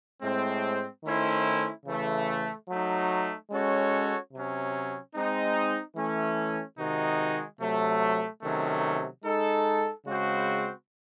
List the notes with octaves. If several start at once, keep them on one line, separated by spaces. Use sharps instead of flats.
A2 G#3 C4
D#3 A3 C#4 E4 C5
C#3 E3 A3
F#3 A3 D#4
G#3 C#4 F#4 A4 C#5
C3 F#3 C#4
G#3 C4 D#4
E3 A3 C#4
C3 D#3 G#3 D#4 F#4
C3 F#3 A3
C3 D#3 F#3 A3 C#4
G#3 D#4 A4
C#3 G#3 C4 F#4 C5